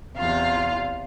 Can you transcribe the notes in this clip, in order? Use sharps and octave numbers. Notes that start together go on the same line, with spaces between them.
E2 C3 F4 F5